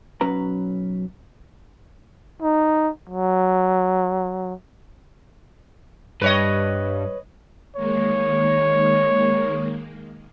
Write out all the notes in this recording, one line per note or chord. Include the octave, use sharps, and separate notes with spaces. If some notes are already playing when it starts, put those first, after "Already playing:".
B1 F#3 C#4 B4 A#5
D#4
F#3
G2 B4 C#5 D#5
D#3 G#3 A#3 C#5